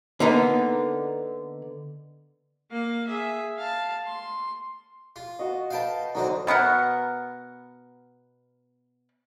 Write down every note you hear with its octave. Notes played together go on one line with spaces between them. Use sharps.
D3 A#3 B3 D#4
A#3 F5
G#4 E5
F5 A5
C6
F4
F#4 D#5
B4 D#5 F5 G5 A5
F#2 D3 C4 D#4 F#4 D6
B2 B3 A#4 F#5